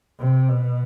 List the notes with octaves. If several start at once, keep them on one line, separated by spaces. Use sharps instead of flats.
C3
B2